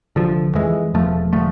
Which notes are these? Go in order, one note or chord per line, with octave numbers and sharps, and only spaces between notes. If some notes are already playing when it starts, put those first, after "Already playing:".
F1 D3 F3
F2 E3 G#3
E1 F3 A3
D3 F3 A3